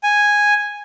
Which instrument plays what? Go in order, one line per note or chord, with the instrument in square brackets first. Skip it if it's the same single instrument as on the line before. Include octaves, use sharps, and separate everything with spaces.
[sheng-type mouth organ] G#5